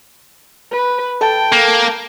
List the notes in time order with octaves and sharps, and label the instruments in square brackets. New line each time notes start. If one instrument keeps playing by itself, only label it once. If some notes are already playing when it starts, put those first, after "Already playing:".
[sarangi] B4
[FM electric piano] A4 A5 [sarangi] G5
[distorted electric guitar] A#3